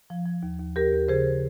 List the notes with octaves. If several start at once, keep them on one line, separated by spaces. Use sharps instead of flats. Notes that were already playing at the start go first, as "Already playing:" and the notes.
F3
F3
D#2
D#2
D#2 G4 A#4
D#2
C#3 G#4 C5